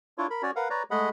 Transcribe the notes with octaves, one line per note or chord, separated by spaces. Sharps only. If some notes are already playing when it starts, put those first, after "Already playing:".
D4 E4 F4 C#5
A#4 B5
C#4 F#4 C#5 D5
A#4 B4 F5 F#5
B4 C#5 D5 A#5
G#3 A3 G#4 D#5 F#5 B5